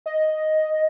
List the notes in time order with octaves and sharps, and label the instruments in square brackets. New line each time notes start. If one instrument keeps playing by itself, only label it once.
[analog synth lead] D#5